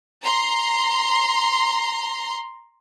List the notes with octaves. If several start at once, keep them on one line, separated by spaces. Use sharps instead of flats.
A#5 C6